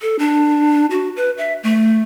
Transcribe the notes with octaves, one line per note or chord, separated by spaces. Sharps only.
A4
D4
F#4
B4
E5
A3